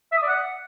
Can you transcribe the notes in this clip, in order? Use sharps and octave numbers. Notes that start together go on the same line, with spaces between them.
E5
D#6
D5
F#5